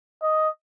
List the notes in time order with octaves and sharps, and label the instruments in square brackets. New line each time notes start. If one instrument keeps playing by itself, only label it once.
[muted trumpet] D#5